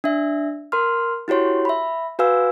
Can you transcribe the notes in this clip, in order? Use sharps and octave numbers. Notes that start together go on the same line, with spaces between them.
D4 E5
A#4 C6 F6
E4 F#4 G4 C#5 C6
E5 B5
F#4 B4 F5 G#5 E6